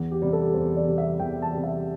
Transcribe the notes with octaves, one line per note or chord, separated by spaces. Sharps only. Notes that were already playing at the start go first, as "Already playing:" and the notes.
Already playing: E2
G4
C3 G3
A4
E2 C5
D5
C3 G3
E5
E2 G5
A5
C3 G3
E5